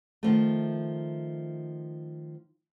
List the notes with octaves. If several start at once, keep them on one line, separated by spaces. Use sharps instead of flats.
D#3 F3 A3